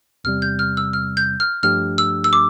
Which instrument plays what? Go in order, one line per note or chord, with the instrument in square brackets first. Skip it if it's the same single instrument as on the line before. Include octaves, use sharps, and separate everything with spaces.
[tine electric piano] E2 C3 G3 [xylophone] F6
[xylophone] G6
F6
E6
F6
G6
F6
[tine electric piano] G2 F3 A3 D4 G4 [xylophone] F6
[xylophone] E6
E6
D6